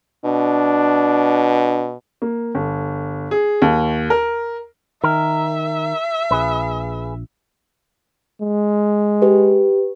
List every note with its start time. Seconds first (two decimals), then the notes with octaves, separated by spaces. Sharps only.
0.25 B2 D4
2.22 A#3
2.55 G1
3.31 G#4
3.62 D#2
4.10 A#4
5.04 D#3 A#4 E5
6.31 A#1 G#4 B4
8.41 G#3
9.22 G4 B4